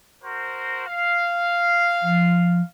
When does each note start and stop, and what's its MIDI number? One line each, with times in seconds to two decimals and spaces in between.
0.23 0.86 66
0.23 0.86 70
0.23 0.86 72
0.88 2.69 77
2.02 2.61 53